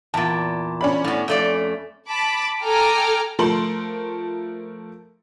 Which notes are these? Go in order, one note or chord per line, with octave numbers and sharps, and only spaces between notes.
E2 A#2 A5
C#4 D4 B5
A2 B3
F2 A3 D5
A5 B5 D6
A4 G5 G#5 A#5 D6 F6
F3 A3 A4 A#4 C6 F#7